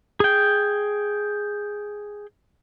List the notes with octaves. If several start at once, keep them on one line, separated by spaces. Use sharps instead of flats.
G#4 G5